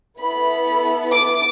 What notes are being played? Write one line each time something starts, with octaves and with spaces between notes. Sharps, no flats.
B3 E4 A4 B5
D6